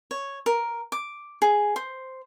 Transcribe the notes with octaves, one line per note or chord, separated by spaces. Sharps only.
C#5
A#4
D6
G#4
C5